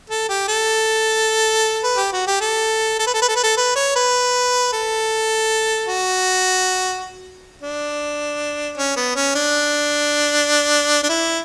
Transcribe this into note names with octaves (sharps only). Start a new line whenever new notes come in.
A4
G4
A4
B4
G4
F#4
G4
A4
A4
B4
A4
B4
A4
B4
A4
B4
C#5
B4
A4
F#4
D4
C#4
B3
C#4
D4
D4
E4